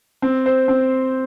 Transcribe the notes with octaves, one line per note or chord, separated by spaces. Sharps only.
C4
C5
C4